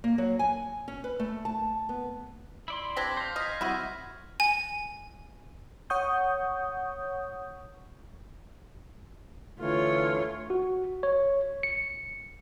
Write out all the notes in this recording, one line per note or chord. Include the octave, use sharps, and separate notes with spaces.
A#3
F#3
G#5
C#4
B4
A3
A5
B3
E4 D5 C6
C4 D4 G4 G#6 A#6 B6
C5 F5 G6
D#5 F6 B6
G3 C4 E4 F#4 D#5
G#5
C#5 F#5 C#6 D#6 G6
D3 E3 A3 F4 C#5
F#4
C#5
C#7